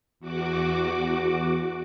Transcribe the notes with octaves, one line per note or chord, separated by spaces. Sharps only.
E2 F#4 D6